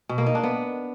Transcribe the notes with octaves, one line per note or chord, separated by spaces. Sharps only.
B2
A#3
D#4
D4
B3